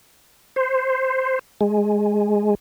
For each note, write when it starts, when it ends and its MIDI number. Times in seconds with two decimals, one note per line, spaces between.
0.56 1.39 72
1.61 2.55 56